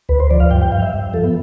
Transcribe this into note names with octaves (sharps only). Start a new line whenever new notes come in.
D2 B4
C5
F3 D5
F5
G2 G5
G5
G2 F5
E5
G2
F3 A4
B3